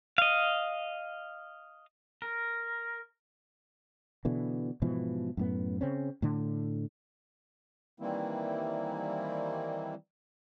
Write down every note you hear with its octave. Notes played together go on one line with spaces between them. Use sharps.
D#5 F5
A#4
B2 D3 E3
G#2 B2 E3 F3
F#2 A2 B3
C#3 C4 C#4
A2 D3
D#3 E3 G3 A#3 C4 E4